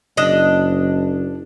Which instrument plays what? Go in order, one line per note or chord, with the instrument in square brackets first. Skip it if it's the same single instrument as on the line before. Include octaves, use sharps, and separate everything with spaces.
[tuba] F#1 [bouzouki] D4 D#5